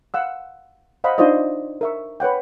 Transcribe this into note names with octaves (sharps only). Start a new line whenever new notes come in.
F5 F#5 E6
C5 D#5 F5 F#5 B5
D4 D#4 F4 C5 D5 D#5
A#4 E5 C#6
B4 C#5 F#5 G5